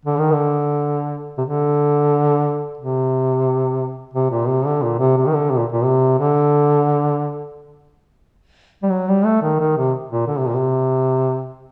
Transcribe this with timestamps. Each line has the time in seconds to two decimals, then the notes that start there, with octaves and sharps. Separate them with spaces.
0.05 D3
0.18 D#3
0.32 D3
1.38 C3
1.41 D3
2.78 C3
4.13 C3
4.30 A#2
4.48 C3
4.66 D3
4.82 A#2
4.99 C3
5.17 C3
5.26 D#3
5.33 D3
5.50 C3
5.58 A#2
5.72 A#2
5.84 C3
6.19 D3
8.83 G3
8.90 F#3
9.08 G3
9.25 A3
9.42 D#3
9.60 D#3
9.77 C3
10.11 A#2
10.27 D3
10.37 C3
10.47 A#2
10.55 C3